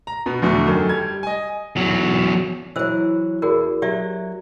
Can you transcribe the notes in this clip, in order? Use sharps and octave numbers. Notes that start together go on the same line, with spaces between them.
A#5
B2 B3
E2 B2 D3 A3
F#2 D#3 A4
G3 G#6
D#5 G#5
E2 F#3
E3 F#3 C5 E6
E2 F#4 G#4 A#4
F#3 G4 D5 E5